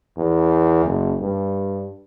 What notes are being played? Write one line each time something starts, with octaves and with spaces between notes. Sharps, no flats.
E2
F#1
G2